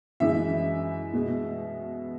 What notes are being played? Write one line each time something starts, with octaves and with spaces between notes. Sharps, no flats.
F#2 E3 G#3 E5
B2 G#3